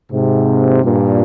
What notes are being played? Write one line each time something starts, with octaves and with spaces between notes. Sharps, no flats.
G#2 C3
G2 A#2